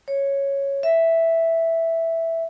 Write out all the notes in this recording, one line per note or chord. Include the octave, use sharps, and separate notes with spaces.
C#5
E5